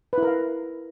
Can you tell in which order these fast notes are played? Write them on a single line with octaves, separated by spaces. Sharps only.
B4 E4 A#4 F5